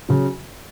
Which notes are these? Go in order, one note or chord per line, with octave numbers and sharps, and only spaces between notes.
C#3 F#3